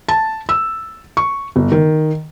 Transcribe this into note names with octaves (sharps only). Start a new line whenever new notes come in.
A5
E6
C#6
G1
D#3